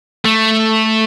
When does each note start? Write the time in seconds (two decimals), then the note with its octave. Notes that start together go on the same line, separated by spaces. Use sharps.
0.25 A3